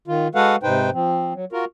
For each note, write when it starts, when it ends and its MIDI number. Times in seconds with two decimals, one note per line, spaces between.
0.08 0.28 51
0.08 0.28 65
0.35 0.56 56
0.35 0.56 66
0.35 0.56 69
0.35 0.56 71
0.35 0.56 77
0.35 0.56 78
0.63 0.90 44
0.63 0.90 48
0.63 0.90 63
0.63 0.90 71
0.63 0.90 72
0.63 0.90 79
0.93 1.33 53
0.93 1.33 60
1.34 1.45 54
1.52 1.65 65
1.52 1.65 66
1.52 1.65 70